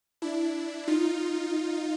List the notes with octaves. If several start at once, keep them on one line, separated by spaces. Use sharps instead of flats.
D4 E4
D#4 F4